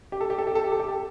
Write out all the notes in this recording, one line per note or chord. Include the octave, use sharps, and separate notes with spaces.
G4
A4
G4
A4
G4
A4
G4
A4
G4
A4